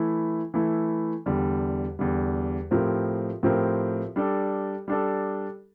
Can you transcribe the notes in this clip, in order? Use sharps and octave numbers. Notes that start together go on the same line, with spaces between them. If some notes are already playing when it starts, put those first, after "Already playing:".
Already playing: E3 A3 E4
E3 A3 E4
E2 D3 G3
E2 D3 G3
A2 F3 C4 G4 A#4
A2 F3 C4 G4 A#4
G3 D4 A4
G3 D4 A4